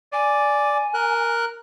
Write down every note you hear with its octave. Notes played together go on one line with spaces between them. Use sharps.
D5 G#5
A#4 F#6